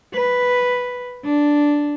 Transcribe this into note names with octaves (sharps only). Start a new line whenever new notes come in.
B4
D4